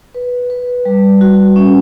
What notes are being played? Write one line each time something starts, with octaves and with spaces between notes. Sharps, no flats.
B4
B4
G3
F#4
C#4